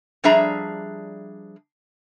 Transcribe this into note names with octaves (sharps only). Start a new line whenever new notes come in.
F3 G3 D4 G#4 E5 A#5